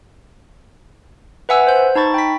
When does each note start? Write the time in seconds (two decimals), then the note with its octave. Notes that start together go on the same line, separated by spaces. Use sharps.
1.49 B4 E5 F#5 G#5 E6
1.67 C5 G6
1.95 D#4 A5 B5 C#6 A6
2.14 G5 B5 B6